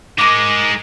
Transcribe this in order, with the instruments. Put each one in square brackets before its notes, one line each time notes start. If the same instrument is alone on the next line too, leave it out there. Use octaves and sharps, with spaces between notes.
[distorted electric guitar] G#3 D#4 [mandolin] A#4 D6